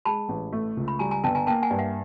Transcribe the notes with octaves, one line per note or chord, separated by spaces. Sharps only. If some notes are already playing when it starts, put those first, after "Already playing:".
G#3 A5 B5
A1
A3
C#2
B5
G3 G#5 A#5
G#5 A#5
G1 G5 A5
G#5 A#5
A#3 G5 A5
F#5 G#5
G2
E5 F#5